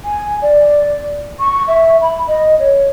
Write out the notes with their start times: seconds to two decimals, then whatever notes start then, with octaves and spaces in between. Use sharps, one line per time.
0.05 G#5
0.42 D5
1.40 C#6
1.68 E5
2.02 B5
2.28 D#5
2.60 C#5